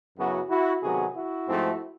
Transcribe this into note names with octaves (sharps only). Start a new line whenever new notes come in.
F#2 C#3 F#3 B3 E4 F#4
E4 F#4
C3 D#3 F#3 B3 F#4 G#4
E4 F#4
G#2 F3 A3 C4